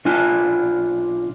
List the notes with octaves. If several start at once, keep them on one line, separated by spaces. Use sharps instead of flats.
B1 D4 F4 G#5